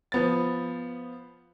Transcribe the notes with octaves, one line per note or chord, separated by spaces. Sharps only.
F3 B3 A6